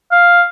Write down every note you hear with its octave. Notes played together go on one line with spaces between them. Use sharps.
F5